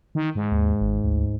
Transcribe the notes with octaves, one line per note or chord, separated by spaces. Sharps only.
D#3
G#2
D#2
G#1
D2